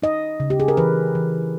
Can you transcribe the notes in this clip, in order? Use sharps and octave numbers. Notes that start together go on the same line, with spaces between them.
D#4 D#5
C#3
G4
G#4
A#4
E3 B4
E3